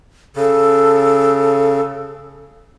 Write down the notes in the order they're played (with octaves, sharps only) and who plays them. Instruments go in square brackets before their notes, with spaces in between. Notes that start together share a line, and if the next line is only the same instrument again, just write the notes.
[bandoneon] C#3 [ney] A4